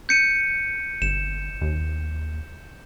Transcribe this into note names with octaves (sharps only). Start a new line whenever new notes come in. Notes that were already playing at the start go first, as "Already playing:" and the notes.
G6 C#7 D#7
G1 E7
D#2